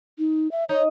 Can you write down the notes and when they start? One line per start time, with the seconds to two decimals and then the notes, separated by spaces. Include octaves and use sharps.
0.19 D#4
0.52 E5
0.69 D#4 C#5